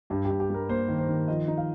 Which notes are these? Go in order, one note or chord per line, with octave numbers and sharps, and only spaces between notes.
G2 G4
G4
G2
G4
G3 A#4
A#3 C5
D#3
C5
D#3
F3 D#5
D#4
F5